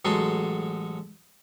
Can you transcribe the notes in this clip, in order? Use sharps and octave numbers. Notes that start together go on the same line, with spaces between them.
A1 F#3 G#3 F#4 A4 C6